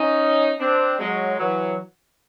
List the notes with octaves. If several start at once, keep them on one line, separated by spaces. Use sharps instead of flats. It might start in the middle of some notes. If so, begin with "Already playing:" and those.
Already playing: C#4 D#4
C4 D4
F#3 G#3
E3 F#3